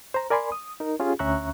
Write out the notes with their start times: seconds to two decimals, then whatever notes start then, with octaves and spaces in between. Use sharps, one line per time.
0.14 C5 A#5
0.30 A#4 D5 G#5 B5 C6
0.52 D#6
0.80 D#4 A#4
1.00 C#4 F4 G4 G#4
1.19 D2 C#4 E5 A#5 C#6 F#6